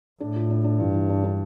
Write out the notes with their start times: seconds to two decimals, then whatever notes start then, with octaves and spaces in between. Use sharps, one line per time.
0.20 A2 D4
0.36 F4
0.50 D4
0.64 D4
0.79 G2 E3
0.94 E3
1.09 D4
1.24 D4